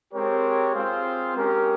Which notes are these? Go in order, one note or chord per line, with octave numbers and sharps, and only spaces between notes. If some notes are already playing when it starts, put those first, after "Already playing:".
G#3 C4 G4 A#4 C#5
C4 F4 G#4 C5 F5
G#3 C#4 G4 A#4